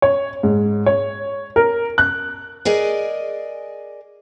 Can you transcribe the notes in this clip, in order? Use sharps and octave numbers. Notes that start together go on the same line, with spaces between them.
C#5
G#2
C#5
A#4
F#6
G#4 A#4 D5 D#5 G#5